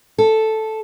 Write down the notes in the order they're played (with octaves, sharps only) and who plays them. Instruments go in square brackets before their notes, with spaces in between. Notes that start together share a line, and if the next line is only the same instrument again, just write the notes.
[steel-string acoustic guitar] A4